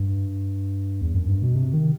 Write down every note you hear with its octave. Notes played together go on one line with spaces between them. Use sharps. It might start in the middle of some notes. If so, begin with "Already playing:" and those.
Already playing: G2
E2
F#2
G2
B2
C3
D#3